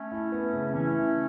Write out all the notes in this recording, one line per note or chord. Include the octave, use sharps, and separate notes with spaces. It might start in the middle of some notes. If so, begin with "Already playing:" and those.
Already playing: A3 C#4
E4
B3
C#3
E3 A3 C#4
E4